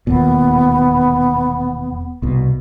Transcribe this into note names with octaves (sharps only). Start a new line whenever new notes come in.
E1 D#2 A#2 B3
C2 B2